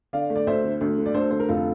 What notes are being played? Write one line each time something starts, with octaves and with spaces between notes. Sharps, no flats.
D3 D5 F5
A3
D5
D2 C5 E5
D3
D2
D3
D5
D2 A4 C5
D3 C5
A#4
F1 F4 A4